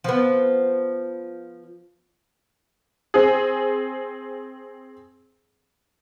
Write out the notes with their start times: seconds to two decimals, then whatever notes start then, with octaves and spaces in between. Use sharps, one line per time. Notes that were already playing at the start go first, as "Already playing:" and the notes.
0.04 F3 B3
3.14 C4 G#4